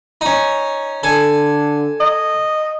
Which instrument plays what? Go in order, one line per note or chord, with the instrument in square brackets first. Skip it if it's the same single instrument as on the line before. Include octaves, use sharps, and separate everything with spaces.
[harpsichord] C#4 D#4
[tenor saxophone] D3 [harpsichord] A4 G#5
[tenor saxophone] D#5